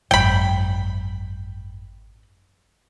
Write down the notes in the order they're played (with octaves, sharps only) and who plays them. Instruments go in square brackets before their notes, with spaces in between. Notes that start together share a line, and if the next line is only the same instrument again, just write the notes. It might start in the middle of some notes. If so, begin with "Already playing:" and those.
[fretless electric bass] G#1 F#2 [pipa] G5 B5